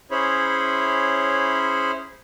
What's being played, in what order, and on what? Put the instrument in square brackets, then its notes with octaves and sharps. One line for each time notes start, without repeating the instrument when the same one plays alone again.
[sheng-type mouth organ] C#4 E4 G#4 C5 C#5 B5